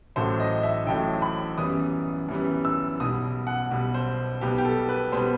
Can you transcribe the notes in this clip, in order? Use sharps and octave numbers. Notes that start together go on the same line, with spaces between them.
A1 A2 F#3 A3 C5
D#5
E5
A1 A2 F#3 A3 G5
B5
F#2 E3 G3 B3 D#6
F#2 E3 G3 B3
E6
B1 B2 G3 D#6
F#5
B1 B2 G3
C5
B1 B2 G3 B3 G4
G4
A4
B4
B2 G3 B3 C5